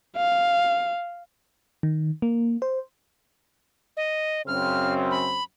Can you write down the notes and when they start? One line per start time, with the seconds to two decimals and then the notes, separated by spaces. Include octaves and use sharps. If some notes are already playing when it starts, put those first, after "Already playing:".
0.17 F5
1.83 D#3
2.22 A#3
2.62 C5
3.97 D#5
4.47 F#2 C#3 C4 F6
5.11 B5